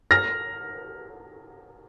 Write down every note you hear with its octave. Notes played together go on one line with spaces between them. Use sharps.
F6 A#6